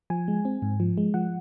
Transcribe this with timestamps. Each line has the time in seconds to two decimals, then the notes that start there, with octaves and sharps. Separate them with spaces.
0.10 F3 G#5
0.28 G#3
0.45 C4
0.62 G#2
0.80 F3
0.98 G#3
1.14 F3 F#5